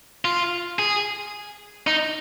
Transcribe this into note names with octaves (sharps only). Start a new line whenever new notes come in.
F4
G#4
D#4